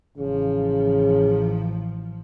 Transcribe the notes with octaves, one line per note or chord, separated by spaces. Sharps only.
A1 C#3 F3